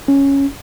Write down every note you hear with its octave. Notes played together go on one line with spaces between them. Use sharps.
C#4